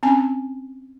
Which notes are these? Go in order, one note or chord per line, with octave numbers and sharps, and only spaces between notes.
C4 C#4 G#5